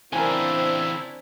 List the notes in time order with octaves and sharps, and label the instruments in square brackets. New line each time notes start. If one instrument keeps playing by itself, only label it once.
[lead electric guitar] C#3 E3 [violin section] C4 D4 C5 [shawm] E4 [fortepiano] A#4 G#5